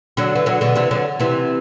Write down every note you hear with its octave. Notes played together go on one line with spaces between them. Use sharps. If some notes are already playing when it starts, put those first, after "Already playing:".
D3 F#3
E3
D3 F#3
B2 D3
C3 E3
D3 F#3
C3 E3